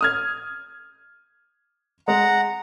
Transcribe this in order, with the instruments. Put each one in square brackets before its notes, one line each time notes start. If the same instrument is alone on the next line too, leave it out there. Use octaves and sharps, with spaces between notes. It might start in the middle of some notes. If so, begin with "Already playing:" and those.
[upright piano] D#6 F6 G#6
[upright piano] G#3 [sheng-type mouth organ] F#5 A#5